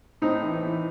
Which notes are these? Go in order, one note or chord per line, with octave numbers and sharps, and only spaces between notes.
A2 C4 D#4
E3
E3